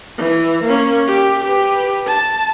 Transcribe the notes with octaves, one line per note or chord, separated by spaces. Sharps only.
E3
A#3 C#4
G4
G4 B4
A5